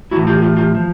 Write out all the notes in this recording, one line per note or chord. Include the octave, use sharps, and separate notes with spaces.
A2 E3 E4 F#4
F4 G4
G#4
F4 G4
F4 G4
F3